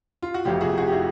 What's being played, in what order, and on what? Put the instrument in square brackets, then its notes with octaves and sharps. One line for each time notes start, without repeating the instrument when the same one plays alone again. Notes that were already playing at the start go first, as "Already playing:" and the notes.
[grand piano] F4
F#4
F1 F2 C3 F4 G4
F#4 G#4
F#4 G#4
G4
E4 F#4